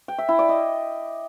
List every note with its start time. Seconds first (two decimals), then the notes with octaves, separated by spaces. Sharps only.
0.08 G5
0.18 E5
0.29 E4
0.39 D5
0.49 D#5